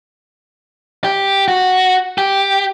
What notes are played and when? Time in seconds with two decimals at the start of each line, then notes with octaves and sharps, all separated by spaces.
1.04 G4
1.48 F#4
2.18 G4